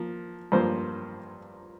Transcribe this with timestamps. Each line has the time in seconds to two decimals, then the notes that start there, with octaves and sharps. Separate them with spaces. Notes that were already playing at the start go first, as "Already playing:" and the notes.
Already playing: F3 A#3
0.52 G2 F3 A#3 C5